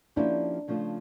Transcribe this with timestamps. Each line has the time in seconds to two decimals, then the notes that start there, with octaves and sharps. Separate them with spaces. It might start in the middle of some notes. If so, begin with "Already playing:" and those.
0.16 F3 A#3 C#4 D4 E4 G4
0.68 C#3 F3 A3 D4 F4